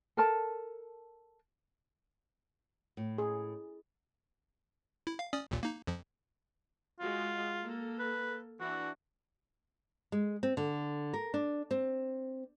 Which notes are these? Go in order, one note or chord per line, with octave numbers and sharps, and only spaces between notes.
A4 A#4 A5
A2
G#4
E4
F5
C#4 D5 D#6
A1 D#2 A#2
A#3 D#4
F2 F3
G#3 F4 F#4
A#3 A4
B4
E3 D4 F#4
G#3
C4
D3
A#4
D4
C4